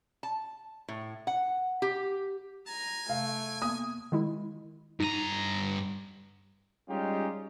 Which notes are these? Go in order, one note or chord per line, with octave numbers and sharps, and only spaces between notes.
A5
A2
F#5
G4
G#5 A#5
C3 A3 F5
A#3 B3 D#6
D#3 G#3 E4
G2 D#4 A#5 D#7
G3 G#3 C#4 D#4 F4 G4